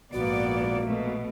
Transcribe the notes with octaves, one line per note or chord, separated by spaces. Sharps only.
A#1 G#2 A#3 B3 F#4 D5
B2 A3